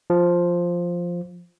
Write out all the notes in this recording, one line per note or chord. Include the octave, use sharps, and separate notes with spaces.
F3